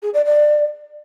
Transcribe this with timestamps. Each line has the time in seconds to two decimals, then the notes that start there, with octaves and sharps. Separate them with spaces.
0.03 G#4
0.14 D5
0.25 D5